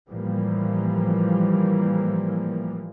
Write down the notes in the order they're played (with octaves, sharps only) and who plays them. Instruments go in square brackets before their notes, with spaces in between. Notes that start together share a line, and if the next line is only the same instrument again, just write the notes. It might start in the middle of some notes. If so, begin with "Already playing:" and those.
[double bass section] A2 E3 F3 G3 A#3